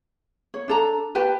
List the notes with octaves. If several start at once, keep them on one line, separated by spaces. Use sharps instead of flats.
C#5
D4 A4 A#5
G4 B4 G5 A5